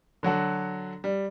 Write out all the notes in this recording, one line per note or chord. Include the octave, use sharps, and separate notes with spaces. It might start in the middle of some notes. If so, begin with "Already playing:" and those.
D3 F#3 F#4 A4
G3